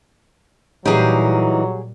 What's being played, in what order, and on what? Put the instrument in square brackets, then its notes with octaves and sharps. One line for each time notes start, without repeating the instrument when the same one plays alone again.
[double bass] A#2 G3 [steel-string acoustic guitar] E3 D#4 [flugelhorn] F#3 [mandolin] G4 G#4